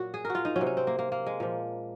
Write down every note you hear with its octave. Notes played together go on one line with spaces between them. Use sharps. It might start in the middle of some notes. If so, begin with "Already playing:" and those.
Already playing: A#2 F#3 F#4
G#4
F#4 A#4
F4
D#4
F#3 C#4
C3
C#4
C4
A#3
A#3
A#3
G#3
A#2 F3